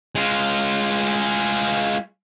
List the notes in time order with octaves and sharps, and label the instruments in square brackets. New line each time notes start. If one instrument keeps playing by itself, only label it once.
[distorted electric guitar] G#3 F4